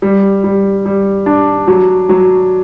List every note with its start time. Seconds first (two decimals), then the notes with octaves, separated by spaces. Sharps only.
0.02 G3
0.44 G3
0.86 G3
1.26 D4
1.67 F#3
2.09 F#3